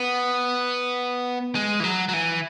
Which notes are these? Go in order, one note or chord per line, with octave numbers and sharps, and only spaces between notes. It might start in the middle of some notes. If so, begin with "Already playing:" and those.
Already playing: B3
G#3
E3
F#3
F#3
E3